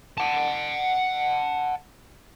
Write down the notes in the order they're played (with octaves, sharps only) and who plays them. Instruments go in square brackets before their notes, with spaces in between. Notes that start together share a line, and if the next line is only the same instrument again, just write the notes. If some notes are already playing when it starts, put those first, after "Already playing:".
[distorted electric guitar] F#5 A5